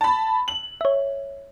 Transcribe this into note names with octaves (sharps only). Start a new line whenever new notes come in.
A5 B5
F#7
C#5 E5